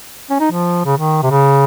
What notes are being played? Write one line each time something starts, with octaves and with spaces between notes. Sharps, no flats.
C#4
D#4
F3
C#3
D#3
C3
C#3